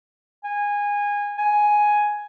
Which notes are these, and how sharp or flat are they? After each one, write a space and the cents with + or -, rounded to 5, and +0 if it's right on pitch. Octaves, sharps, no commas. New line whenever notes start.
G#5 -20
G#5 +5